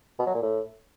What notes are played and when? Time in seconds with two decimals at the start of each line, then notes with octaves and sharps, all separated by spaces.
0.19 B2
0.27 F#3
0.35 A#2
0.42 A2